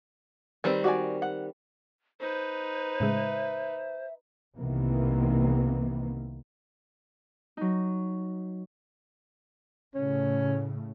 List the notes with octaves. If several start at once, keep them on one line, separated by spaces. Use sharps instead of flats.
D#3 G3 C4 B4
F#4 D5 G#5
F#5
D#4 B4 C5
A2 C#3 G#3 E5
C2 C3 D#3 E3 A#3 B3
F#3 D#4
A2 C#3 C#4